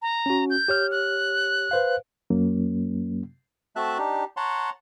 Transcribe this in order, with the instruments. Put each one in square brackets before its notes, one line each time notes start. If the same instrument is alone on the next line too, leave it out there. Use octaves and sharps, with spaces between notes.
[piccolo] A#5
[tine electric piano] C#4 F#4
[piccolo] G6
[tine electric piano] G4 C#5 F6
[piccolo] F#6
[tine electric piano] B4 C5 F5
[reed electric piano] F#2 F#3 A#3 C#4
[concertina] A3 C4 F#4 E5 A5 F#6
D4 D#4 G4
C#5 F#5 A5 A#5 C6